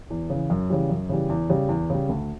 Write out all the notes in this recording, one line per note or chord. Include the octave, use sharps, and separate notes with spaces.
E2
C#3 E3
F#2
C#3 E3 G3
F#2
C#3 E3 G3
E2
C#3 G3
E2
C#3 G3
D2